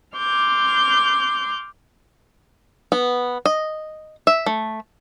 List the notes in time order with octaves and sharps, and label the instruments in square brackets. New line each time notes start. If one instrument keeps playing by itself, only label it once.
[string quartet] C6 D6 F6 G6
[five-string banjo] B3
D#5
E5
A3